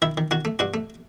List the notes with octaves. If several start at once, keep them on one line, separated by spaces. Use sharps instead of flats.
D#3 E4 E5
D#3
D#3 F#4 F#5
A3
G2 F#4 F#5
A3